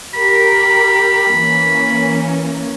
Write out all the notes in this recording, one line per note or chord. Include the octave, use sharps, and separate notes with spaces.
G4 A#4 B5
E3 A#3 C#4